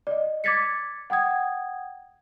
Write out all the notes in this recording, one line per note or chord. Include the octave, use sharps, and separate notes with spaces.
D5 D#5
D6 G#6 A6 B6 C#7
F#5 G5 D#6 G#6